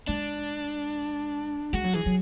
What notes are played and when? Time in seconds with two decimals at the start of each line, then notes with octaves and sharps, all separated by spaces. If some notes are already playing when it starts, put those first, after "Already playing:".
0.08 G#3 D4
1.73 G#3 F#4
1.84 F#3
1.94 E3 G#4
2.06 F#3